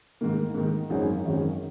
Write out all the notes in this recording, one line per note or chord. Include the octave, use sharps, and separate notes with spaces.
G#2 D#3 A#3
G#2 D#3 A#3
G#1 F#2 D#3 G#3 C#4
G#1 F#2 D#3 G#3 C#4